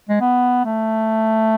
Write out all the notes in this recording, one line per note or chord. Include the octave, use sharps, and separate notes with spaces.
G#3
B3
A3